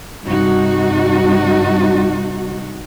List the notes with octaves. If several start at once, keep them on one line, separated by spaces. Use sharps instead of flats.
G2 C3 G3 D#4 F#4